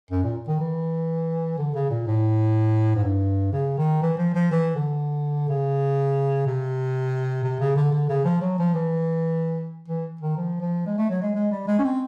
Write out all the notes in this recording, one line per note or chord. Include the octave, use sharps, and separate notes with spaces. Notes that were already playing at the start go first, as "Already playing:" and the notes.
F#2
A#2
D#3
E3
D3
C#3
A#2
A2
G#2
G2
C#3
D#3
E3
F3
F3
E3
D3
C#3
C3
C3
C#3
D3
D3
C#3
F3
F#3
F3
E3
E3
D#3
F3
F3
G#3
A3
F#3
G#3
G#3
G3
G#3
C#4
C4